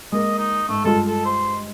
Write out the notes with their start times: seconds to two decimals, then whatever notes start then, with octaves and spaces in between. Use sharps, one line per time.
0.12 G#3 A#3 D#5
0.38 D#4
0.69 G#2 A3
0.84 G2 G#3 F4 A4
1.07 A4
1.25 C5